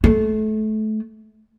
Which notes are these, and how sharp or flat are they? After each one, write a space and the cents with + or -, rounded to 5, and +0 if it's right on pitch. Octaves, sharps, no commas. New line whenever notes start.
A3 -25